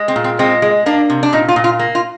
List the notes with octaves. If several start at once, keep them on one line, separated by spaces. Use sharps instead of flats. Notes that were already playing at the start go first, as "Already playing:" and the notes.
Already playing: G#3
C4
A#2
C4
G#3 C4
G#3
A#3 D4
C3
D4
A#2 D#4
F4
A#2
F4
A#3
F4